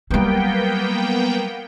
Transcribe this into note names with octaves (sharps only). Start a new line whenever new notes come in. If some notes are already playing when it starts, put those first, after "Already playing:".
F#3 G3 A#3 B3 G5